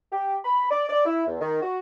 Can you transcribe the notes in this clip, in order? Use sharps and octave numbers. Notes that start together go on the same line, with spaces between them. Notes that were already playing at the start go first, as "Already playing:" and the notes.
G4
B5
D5
D5
E4
E2
D#3
F#4